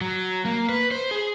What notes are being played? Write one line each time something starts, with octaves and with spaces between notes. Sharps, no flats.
F#3
A#3
B4
C5
G#4